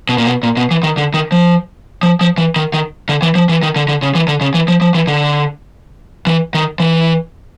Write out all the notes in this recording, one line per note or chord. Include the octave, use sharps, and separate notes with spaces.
B2
A#2
B2
A#2
B2
E3
D#3
D3
D#3
F3
F3
F3
E3
D#3
D#3
D3
E3
F3
E3
D#3
D3
D3
C#3
E3
D3
C#3
E3
F3
F3
E3
D3
E3
D#3
E3